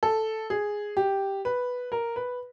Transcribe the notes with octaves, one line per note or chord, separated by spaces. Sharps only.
A4
G#4
G4
B4
A#4
B4